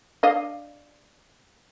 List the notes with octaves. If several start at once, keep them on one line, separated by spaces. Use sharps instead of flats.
D4 D#5 F5